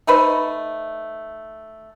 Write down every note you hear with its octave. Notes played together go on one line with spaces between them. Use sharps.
A3 D#4 B4 C5